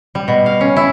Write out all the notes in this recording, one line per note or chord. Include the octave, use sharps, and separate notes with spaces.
G3
B2
F5
C#4
E4